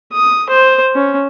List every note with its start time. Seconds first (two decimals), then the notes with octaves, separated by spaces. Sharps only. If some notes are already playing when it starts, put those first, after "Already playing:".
0.13 D#6
0.49 C5
0.95 C#4